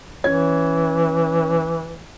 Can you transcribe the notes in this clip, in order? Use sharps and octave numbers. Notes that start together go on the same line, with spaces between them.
E3 C#4 G#6